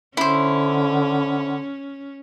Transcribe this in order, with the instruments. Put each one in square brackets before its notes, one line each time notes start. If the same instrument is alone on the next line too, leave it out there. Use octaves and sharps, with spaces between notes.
[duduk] D3 [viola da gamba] C#4 [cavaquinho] E4 C5